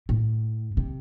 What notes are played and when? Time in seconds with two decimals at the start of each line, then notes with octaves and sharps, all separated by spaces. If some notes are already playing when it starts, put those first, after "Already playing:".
0.09 A2
0.77 C3